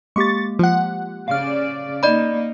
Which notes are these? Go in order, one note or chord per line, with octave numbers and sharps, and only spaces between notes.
G#3 A#3 G4 C#6 A6
F3 F#5
C#3 D5 F5 F6
A#3 D#4 D5 D#5 B5